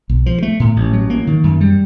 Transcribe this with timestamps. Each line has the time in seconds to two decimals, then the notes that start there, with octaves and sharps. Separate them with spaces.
0.09 B1
0.26 F3
0.42 A3
0.60 A2
0.76 A1
0.93 F#3
1.10 A#3
1.27 D#3
1.43 F#2
1.61 G3